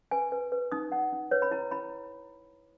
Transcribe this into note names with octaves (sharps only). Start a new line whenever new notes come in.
B4 G#5
B4
B4
D#4 D#6
D#4 F#5
D#4
B4 C#5
B5
E4 A#5
E4 B5